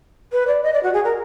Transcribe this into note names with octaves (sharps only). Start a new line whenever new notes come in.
B4
D5
D#5
D5
F#4
G#4
A#4